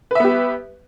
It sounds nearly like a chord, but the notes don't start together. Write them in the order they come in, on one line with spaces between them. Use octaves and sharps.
B4 E5 B3 G4